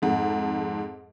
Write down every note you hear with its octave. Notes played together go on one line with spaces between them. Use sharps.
F2 G#2